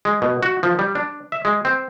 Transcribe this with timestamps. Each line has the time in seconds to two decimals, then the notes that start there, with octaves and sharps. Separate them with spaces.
0.05 G#3
0.22 B2
0.43 F#4
0.63 F3
0.79 G3
0.95 D4
1.32 E5
1.45 G#3
1.65 C4